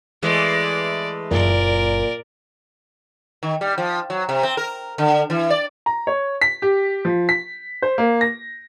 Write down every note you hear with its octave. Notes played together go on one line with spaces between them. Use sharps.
E3 G#3 A3 D5
F#1 A#2 A#4 D5
D#3
G3
F3
F#3
C3
C4
A#4
D3
E3
D5
A#5
C#5
B6
G4
F3
B6
C5
A#3
A#6